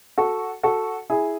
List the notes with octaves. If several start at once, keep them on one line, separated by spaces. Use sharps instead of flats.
F#4 A4
F#4 A4
E4 G#4